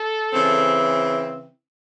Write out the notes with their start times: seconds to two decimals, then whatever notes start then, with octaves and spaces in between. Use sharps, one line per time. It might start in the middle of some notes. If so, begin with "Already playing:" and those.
Already playing: A4
0.33 C#3 E3 C4